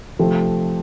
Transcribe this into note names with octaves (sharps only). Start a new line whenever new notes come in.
C3 F3 A3 C4